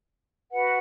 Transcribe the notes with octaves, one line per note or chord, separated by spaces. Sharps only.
F#4 B4 F#5